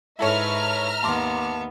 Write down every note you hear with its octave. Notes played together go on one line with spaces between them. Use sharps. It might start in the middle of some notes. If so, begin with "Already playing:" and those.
G#2 E4 A4 B4 C#5 E5 A#5 F6
D#2 B3 A5 C6 D6